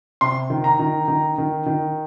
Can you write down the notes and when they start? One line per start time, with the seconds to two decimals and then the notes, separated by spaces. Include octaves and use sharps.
0.21 C3 C6
0.50 D#3
0.64 A#5
0.79 D#3
1.08 D#3
1.38 D#3
1.66 D#3